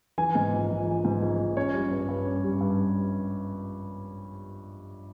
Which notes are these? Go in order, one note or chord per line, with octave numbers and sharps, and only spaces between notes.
E3 G#5
G#2
A#1
A#1
E3
G#2
A#1
A#1
C#4 C#5
G3
G2
G2
C#4
G3
G2